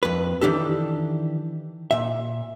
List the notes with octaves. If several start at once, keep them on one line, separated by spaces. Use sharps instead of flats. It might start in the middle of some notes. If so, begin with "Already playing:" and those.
F2 B4
D#3 E3 D4 G4 A4
A#2 E5